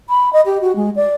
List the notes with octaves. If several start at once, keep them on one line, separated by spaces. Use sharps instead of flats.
B5
D#5
G4
F#4
G#3
D5